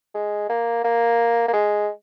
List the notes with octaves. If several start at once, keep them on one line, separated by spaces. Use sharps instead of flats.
G#3
A#3
A#3
A#3
G#3